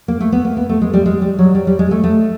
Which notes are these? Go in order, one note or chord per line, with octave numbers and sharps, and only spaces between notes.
A#3
A3
B3
A#3
B3
A3
G#3
G3
G#3
G3
F#3
G3
G3
G#3
A3
A3